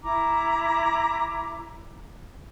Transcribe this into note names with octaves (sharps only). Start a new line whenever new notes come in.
E4 A#5 D6